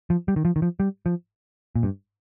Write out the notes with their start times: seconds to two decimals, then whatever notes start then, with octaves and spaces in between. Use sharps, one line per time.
0.10 F3
0.28 G3
0.36 D#3
0.45 F3
0.56 D#3
0.62 F3
0.80 G3
1.06 F3
1.76 A#2
1.83 G2